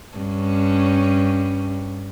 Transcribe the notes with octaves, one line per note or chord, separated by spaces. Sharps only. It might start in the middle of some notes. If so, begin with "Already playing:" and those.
G2 C#4